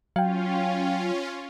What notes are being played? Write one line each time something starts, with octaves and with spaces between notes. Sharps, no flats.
F#3 C#4 F4 F5 G5